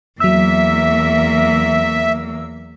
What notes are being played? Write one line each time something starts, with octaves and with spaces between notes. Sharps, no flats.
E2 F#3 A#3 E5 E6